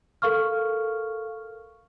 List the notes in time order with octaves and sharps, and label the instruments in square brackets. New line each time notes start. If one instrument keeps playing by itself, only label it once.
[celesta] A4 A#4 F5 C#6 F6